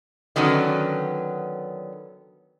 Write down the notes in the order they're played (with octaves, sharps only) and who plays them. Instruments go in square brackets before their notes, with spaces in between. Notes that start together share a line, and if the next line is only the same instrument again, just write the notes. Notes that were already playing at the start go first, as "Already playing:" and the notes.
[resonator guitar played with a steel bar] D3 D#3 F#3 B3 C#4